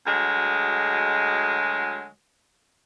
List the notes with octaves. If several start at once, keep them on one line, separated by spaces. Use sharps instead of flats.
D2 F#3 G#3